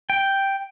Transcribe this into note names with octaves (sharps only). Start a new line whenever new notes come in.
G5